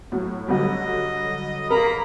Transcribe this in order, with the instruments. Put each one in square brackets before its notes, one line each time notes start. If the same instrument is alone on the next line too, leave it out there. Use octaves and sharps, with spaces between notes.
[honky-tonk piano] A2 F#3
[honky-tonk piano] D3 F#3 G3 [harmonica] D#5
[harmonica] A#3 A#5 B5 [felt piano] A#4